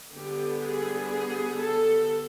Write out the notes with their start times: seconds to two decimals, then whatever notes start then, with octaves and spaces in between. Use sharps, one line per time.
0.14 D3 G3 B3 G4
0.62 G#4
1.11 G#4
1.59 A4